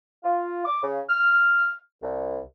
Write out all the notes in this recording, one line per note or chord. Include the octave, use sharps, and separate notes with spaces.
F4
D6
C#3
F6
C2